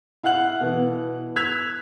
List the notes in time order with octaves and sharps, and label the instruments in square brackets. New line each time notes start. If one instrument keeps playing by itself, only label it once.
[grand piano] E4 F5 F#5 F#6 F#7
B2 E3
E6 F#6 G#6 B6 F7